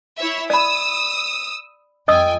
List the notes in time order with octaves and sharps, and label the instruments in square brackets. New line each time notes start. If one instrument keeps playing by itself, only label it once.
[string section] E4 C#5 E5
[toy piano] D5 B5 [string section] D#6 E6
[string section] F2 G5 G#5 [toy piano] D#5 D#6 E6